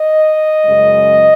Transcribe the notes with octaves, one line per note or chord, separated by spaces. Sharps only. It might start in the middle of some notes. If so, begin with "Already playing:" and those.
Already playing: D#5
F#2 C#3 G#3